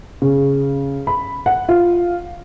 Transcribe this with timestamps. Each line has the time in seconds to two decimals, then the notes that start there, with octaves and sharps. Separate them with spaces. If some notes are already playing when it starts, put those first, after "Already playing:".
0.22 C#3
1.07 B5
1.46 F#5
1.69 F4